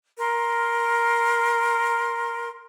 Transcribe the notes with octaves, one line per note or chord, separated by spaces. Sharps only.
A#4 C6